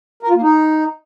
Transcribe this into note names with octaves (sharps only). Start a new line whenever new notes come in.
A#4
F4
A#3
D#4